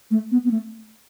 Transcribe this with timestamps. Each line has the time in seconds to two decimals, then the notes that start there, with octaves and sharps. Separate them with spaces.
0.11 A3
0.32 B3
0.45 B3
0.51 A3